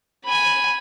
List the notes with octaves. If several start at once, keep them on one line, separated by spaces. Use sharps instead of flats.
G#5 B5